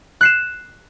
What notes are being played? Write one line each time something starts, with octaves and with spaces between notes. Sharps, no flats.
F#6 C7 E7